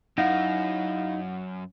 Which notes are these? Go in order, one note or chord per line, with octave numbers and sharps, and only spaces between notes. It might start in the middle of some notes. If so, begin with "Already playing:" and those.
F#2 D#4 E4 F5 F#5 A#6